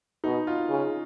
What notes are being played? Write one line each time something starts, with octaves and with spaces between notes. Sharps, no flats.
B2 D#4
F4
C#3